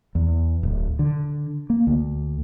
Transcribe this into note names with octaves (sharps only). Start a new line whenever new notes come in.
E2
D1
D3
A#3
D2